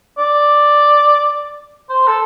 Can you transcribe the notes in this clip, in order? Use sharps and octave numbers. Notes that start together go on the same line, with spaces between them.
D5
C5
A4